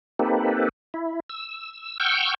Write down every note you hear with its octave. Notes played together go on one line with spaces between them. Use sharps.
A#3 C4 D#4 G4 A4 B4
E4
E6
F#5 G5 C#6 E6 F6 G6